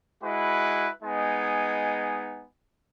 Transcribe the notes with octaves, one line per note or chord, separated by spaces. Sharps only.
G#3 E4 F#4 B4
G#3 B3 D#4 G#5